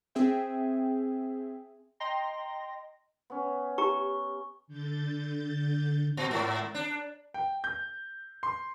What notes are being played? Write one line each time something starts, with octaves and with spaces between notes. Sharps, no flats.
C4 G#4 E5 G5
D#5 G5 A#5 C6 A#6
B3 C#4
G4 A#5 C#6
D3 G6 A6
A#2
G#2
D4
G5
G6
C6